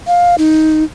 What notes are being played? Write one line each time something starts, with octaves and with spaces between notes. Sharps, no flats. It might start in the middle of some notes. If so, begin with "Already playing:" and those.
F5
D#4